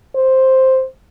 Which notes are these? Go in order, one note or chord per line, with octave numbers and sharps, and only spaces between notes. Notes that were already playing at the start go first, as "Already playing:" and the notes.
C5